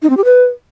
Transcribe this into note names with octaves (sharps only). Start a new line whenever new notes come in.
D#4
C4
G4
B4